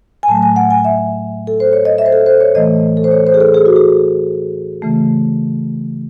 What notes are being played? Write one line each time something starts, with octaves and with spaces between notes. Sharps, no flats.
G#5
A2 F#3 A3 A5
G#5
F#5
G#5
E5
A4
C5
C#5
D#5
E5
C5
A4
C5
C#5
A2 E3 A3 D#5
A4
C5
C#5
C5
G#4
A4
G#4
F#4
G#4
C#3 E3 A3